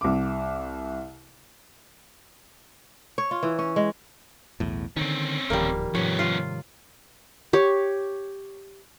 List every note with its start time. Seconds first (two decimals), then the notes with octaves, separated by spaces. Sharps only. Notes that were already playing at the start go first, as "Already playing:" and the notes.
0.01 C2 D6
3.18 C#5
3.31 F4
3.43 E3
3.59 C#4
3.76 G#3
4.60 B1 E2 A2
4.96 D3 D#3 C4 C#4
5.50 D1 A#1 D#3 F3 G3 A#3
5.95 G#2 C3 F3 G3 B3 C#4 C#5
6.19 F4
7.53 G4 C#5